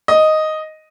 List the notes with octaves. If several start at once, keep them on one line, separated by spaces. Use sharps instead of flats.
D#5